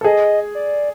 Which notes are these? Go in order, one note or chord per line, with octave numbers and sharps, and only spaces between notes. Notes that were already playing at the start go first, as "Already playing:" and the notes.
A4
G#4 D#5
D5